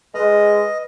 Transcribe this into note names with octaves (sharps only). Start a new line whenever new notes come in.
G#3 B4 D#5 F6